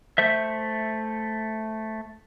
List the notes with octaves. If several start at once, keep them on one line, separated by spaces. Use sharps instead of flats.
A3 C5 E5